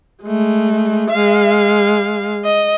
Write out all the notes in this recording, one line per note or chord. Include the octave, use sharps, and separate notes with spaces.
G#3 A3
G#3 F5
D#5